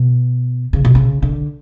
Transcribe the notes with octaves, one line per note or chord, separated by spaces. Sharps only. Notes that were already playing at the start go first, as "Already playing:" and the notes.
Already playing: B2
C#3
B2
C#3
D3